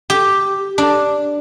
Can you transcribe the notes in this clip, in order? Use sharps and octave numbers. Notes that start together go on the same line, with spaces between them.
G4
D4